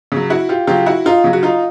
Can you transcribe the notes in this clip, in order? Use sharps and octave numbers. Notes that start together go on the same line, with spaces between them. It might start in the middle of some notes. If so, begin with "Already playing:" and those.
C#3 F#3
E4 F#4
F4 G4
C#3 F#3 F4 G4
E4 F#4
D#4 F4
C#3 F#3
F#4
D#4 F4